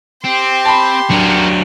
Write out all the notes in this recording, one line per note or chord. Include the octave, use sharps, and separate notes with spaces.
C4 G4 C6
A5 B5
F#3 D4 F#4 A#4